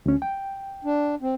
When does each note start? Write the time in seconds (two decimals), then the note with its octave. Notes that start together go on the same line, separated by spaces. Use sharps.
0.06 D2 C#4
0.22 G5
0.85 D4
1.22 C4